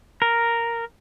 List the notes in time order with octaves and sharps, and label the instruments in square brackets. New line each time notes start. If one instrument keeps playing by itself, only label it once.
[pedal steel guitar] A#4